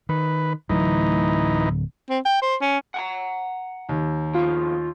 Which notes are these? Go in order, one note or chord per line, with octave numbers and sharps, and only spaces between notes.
D#3 B4
D1 E3 F#3 A3 D#4
C4
G5
C5
C#4
F#5 G#5 A#5
D#2
B2 F3 F4